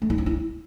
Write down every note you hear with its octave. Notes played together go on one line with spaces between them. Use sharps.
A3
D#4
C4
E4